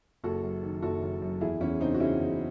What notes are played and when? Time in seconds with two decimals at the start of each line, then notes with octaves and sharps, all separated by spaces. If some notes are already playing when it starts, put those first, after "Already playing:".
0.24 F#1 F#4 A4
0.43 F#2
0.63 D#3
0.82 F#1 F#4 A4
1.02 F#1
1.22 F#2
1.41 E2 E4 G#4
1.61 E2 C#4 E4
1.80 C#3 C4 D#4
1.94 F#4
2.00 C#3 C#4 E4
2.20 E2